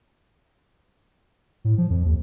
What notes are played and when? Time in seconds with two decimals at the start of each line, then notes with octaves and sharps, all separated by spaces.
1.65 A2
1.78 F3
1.90 F2
2.05 D#2